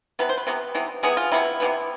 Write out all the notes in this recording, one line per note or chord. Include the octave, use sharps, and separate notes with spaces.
C3 E3 B3 B4
C5
B4
C3 E3 B3
C3 E3 B3
C3 E3 B3 G#4
F4
C3 E3 B3 E4
C3 E3 B3